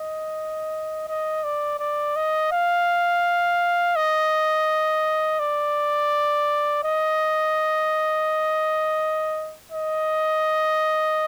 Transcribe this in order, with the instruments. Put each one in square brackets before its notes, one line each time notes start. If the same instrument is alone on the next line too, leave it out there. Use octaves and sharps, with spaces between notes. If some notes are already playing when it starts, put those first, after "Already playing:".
Already playing: [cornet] D#5
D#5
D5
D5
D#5
F5
D#5
D5
D#5
D#5